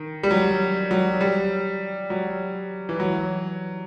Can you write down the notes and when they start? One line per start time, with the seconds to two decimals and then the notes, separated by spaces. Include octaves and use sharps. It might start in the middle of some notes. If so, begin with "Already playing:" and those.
Already playing: D#3
0.23 G3
0.31 F#3
0.91 F#3
1.21 G3
2.10 F#3
2.89 E3
3.00 F#3